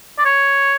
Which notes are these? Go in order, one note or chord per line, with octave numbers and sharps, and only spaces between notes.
D5
C#5